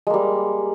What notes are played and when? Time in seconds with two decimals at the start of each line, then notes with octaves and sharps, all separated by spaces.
0.07 G#3
0.10 A#3
0.14 G3